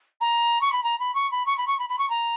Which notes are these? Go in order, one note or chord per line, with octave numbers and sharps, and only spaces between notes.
A#5
C#6
B5
A#5
B5
C#6
B5
C#6
B5
C#6
B5
B5
C#6
A#5